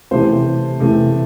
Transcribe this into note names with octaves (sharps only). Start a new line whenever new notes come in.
C3 E3 A3 C5
C3 E3 A3